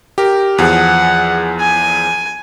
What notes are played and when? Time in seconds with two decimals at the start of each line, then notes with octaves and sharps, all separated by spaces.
0.18 G4 A#4
0.58 E2 F3 G#4 F#5
1.60 G#5